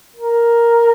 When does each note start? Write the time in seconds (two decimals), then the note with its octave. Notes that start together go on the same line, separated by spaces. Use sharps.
0.16 A#4